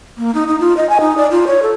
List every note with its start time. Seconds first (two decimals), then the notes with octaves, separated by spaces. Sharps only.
0.18 A#3
0.35 D#4
0.48 D#4
0.60 F4
0.77 D#5
0.90 G#5
1.01 D#4
1.18 D5
1.31 F4
1.47 C#5
1.62 A4